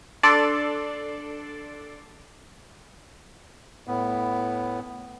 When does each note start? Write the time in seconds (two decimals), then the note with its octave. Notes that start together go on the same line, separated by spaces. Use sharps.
0.23 D4 A4 D5 C6
3.87 A2 B3